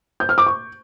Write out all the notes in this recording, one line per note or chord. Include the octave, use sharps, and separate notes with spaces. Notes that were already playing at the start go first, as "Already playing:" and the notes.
G6
F6
D6
C#6